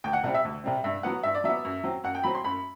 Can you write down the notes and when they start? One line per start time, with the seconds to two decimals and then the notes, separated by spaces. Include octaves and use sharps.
0.04 D2 G5
0.13 F#5
0.23 C3 G3 C4 F#5
0.34 E5
0.44 D2
0.64 C3 G3 C4
0.84 G2 E5
1.03 F#3 B3 F#5
1.23 G2 E5
1.35 D5
1.44 F#3 B3 E5
1.65 F#2
1.84 F#3 C4
2.04 F#2 F#5
2.15 G5
2.23 F#3 C4 B5
2.35 C6
2.44 F#2 B5